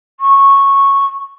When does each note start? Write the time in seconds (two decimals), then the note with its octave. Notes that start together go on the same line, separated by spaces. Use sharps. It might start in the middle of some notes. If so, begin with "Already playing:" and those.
0.20 C#6